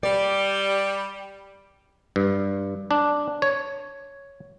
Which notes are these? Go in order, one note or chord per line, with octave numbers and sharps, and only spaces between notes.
G3 D5
G2
D4
C#5